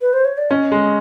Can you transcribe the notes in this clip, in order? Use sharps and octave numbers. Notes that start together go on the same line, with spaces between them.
B4
C5
C#5
D5
C#4 D#5
G#3